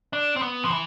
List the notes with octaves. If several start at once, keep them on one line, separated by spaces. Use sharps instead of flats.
D4
C4
B3
F3
E3